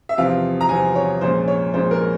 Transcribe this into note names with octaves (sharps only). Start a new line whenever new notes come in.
E5
E2 C3 F3 C4 F5
A#5
E2 C3 F3 C4 G#5
C#5
A#1 A#2 G#3 C#4 C5
C#5
A#1 A#2 G#3 C#4 C5
A#4